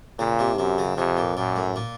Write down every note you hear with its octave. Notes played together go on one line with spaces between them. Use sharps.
A#2 C#3
C3
F#2 C3
C#3
F2 C3
A#2
F#2 A#2
A2
A#2